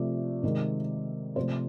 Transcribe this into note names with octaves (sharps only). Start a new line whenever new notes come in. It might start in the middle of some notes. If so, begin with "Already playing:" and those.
Already playing: C3 F3 A3 D5 E5
C3 D#3 G#3
C3 F3 A3 C5 D5